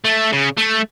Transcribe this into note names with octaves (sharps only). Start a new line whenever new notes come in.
A3
C#3
A3